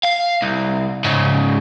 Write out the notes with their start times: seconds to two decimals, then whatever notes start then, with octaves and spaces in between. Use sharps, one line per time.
0.05 F5
0.42 C2
1.04 G#2 C#3